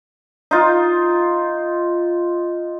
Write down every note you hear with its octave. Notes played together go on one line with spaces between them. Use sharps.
D#4 F4